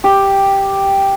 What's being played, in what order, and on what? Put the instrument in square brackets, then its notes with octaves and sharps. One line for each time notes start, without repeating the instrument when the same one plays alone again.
[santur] G4